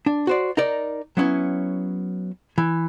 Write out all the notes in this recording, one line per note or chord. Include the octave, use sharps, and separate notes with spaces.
D4
F#4 C5 D5
D#4 A#4 D5
F#3 B3 C#4 E4
E3